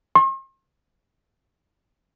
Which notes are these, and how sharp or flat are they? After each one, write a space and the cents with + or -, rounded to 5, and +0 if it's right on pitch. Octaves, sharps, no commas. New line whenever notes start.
C6 +45